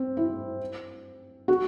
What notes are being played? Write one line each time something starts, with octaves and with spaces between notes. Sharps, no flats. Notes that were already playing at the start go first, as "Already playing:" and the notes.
Already playing: C4
E4
F#4